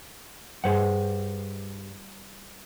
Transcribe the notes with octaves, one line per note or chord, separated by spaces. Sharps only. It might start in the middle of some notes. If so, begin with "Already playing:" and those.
G2 G#4 C5 F#5